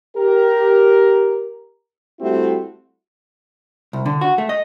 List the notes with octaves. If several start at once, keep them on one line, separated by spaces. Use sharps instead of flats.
G4 A#4
G3 A3 C4 E4 F#4 G4
C2
D3
F#4
A3
D#5